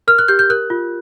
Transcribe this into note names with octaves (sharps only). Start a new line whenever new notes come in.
A#4 F6
F#6
G4 G6
G6
A#4 F#6
F4